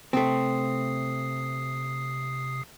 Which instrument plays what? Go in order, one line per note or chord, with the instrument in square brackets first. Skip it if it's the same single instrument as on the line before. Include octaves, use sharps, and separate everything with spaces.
[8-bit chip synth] C3 D#6 C7 [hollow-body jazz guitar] A3 C4